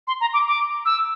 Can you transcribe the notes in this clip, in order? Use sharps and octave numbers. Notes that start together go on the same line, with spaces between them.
C6
A#5
D6
D6
E6